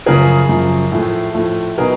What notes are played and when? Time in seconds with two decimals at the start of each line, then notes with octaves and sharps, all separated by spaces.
0.06 F#2 C#3 F3 G#4 A#4
0.49 F#2 C#3 F3
0.92 A2 F3 A3
1.34 A2 F3 A3
1.78 B2 F#3 B3 D#4 G#4 A#4